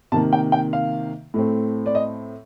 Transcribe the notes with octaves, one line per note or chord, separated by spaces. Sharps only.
C3 D#3 A#3 A5
G5
G5
F5
A2 A3 C4
D5
D#5